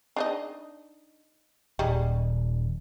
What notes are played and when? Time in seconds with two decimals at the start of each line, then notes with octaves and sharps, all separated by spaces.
0.16 D4 D#4 D#5
1.79 D#1 G3 G#3 D#4